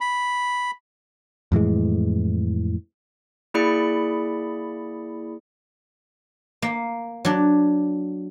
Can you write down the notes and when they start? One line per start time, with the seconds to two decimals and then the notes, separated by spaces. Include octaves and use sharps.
0.01 B5
1.52 F2 A2 E3 G#3
3.54 A#3 E4 G#4 D5 B5 C#7
6.62 A#3
7.25 F#3 D4